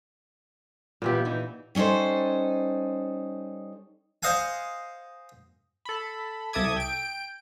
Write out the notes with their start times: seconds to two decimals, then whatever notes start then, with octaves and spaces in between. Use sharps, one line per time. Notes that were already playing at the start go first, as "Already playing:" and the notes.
1.02 A#2 C#3 E3 B3 G4
1.25 E3 D#4
1.75 G3 C#4 D#4 A4 C5
4.23 C5 D#5 F5 F#5 G#5
5.85 A4 B5
6.53 C2 A4 E5 D6 D#6 G#6
6.76 G5 D7